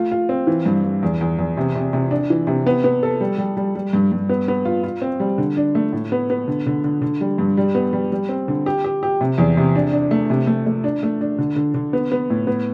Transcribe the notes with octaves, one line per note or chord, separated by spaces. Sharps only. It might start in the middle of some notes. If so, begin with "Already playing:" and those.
Already playing: A3 F4
F4
C4
E3
G2
G2
E2
E2
E2
C3
C3
C3
D4
E3
C3
B3
B3
A4
G3
G3
G3
G3
G2
G2
B3
B3
F4
F4
C4
G3
D3
D4
A3
A2
B3
B3
D3
D3
D3
D3
G3
G2
G3
B3
G3
G3
C4
D3
G4
G4
G4
C3
E2
C3
D4
D4
A3
C3
A3
A3
D4
A3
D4
D3
D3
D3
B3
B3
A2
B3